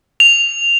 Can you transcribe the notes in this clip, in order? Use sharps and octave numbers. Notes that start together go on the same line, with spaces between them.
F7